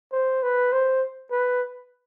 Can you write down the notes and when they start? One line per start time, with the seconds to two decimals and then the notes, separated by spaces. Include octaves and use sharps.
0.13 C5
0.43 B4
0.73 C5
1.31 B4